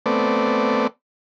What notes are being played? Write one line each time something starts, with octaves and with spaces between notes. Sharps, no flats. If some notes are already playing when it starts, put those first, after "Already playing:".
A3 B3 C4 D5